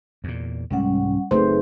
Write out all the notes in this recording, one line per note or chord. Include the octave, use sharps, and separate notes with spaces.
E2 A#2
C2 G#2 G3 G#3 C#4 F#5
F#1 A3 C4 D#4 G#4 B4 C5